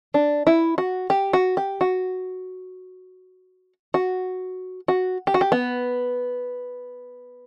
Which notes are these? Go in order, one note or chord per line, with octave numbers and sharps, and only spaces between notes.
D4
E4
F#4
G4
F#4
G4
F#4
F#4
F#4
G4
F#4
G4
B3